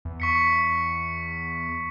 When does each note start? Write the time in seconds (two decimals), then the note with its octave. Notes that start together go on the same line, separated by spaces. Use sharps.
0.05 E2
0.20 C#6 B6 C#7